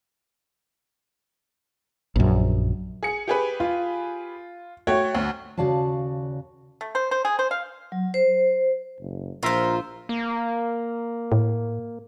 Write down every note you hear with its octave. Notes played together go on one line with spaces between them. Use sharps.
A#1 F#2
G#4 C#7
G4 G#4 B4
F4
A3 F#4 C#5 G5
D2
D#2 C#3 F#4 D5 F5 A5
A3
C5
C5
G#4
C5
F5
F#3
C5
F#1
A#1 F4 A#4 C5 E5
A#3
A2